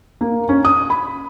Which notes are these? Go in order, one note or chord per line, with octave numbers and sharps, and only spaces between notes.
A#3
C#4
D#6
B5